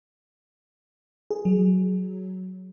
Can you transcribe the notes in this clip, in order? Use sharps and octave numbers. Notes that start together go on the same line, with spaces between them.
G#4
F#3